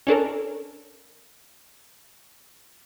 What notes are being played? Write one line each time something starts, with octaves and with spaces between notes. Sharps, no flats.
C#4 D4 A4 A#4